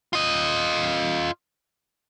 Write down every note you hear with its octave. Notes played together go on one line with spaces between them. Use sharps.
F4 D#5